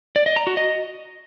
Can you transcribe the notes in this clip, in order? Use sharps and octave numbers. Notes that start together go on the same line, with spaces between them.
D5
D#5
A#5
F#4
D#5